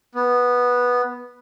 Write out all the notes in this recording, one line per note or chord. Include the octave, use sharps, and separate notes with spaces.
B3